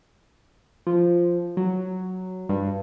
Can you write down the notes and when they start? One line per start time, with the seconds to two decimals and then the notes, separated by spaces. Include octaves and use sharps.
0.87 F3
1.57 F#3
2.49 G2